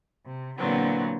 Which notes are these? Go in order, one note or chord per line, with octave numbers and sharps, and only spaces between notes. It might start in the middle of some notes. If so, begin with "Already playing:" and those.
C3
A#2 D3 E3 F#3 B3 C4